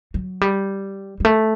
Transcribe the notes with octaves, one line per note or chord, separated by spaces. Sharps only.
F#3
G3
G3
A3